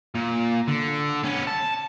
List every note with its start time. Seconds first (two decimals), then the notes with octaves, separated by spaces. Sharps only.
0.15 A#2
0.68 D3
1.23 B3 C#4
1.47 A5